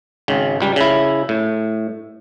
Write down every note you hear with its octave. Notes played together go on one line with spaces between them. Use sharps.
G#1 C#3
C#2 G3
C#3 E4
A2